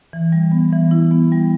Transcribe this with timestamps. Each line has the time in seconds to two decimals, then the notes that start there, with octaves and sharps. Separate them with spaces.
0.13 E3
0.32 G3
0.52 B3
0.72 E3
0.91 E4
1.11 B3
1.32 G3